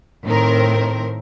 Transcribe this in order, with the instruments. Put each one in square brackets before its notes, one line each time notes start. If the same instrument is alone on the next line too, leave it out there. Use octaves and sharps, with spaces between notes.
[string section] A2 D#3 C4 A#4